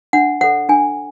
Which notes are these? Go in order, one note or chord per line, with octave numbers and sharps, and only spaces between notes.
D4 F#5
A4 C#5 F#5
D4 G#5